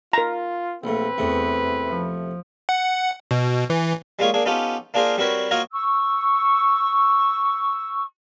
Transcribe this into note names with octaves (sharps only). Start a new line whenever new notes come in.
F4 A#4 A#5
A#1 A2 C4 B4
E2 A2 C3
F3
F#5
B2
E3
G3 G#3 A#3 F4 G#4 C#5
A#3 D4 G#4
B3 C#4 D#4 F4 G4 A4
A#3 D4 F4 G#4 A#4 C5
G3 C4 F#4 A#4 B4 C#5
A#3 F4 F#4 A#4 C#5 D#5
C#6 E6